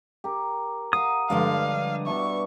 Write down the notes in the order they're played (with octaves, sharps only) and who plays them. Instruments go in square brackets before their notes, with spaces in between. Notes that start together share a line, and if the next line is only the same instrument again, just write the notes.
[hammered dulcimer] G4 A#4
[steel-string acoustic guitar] F5 [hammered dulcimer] F#5 A#5 [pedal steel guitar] D#6
[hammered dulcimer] G2 D4 [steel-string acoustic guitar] D3 F3 G#3 [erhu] F5
[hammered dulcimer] B2 D4 E4 [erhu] C#6